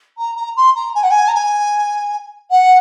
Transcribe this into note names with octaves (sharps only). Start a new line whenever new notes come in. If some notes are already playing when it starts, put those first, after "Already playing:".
A#5
A#5
C6
A#5
G#5
F#5
G#5
A#5
G#5
F#5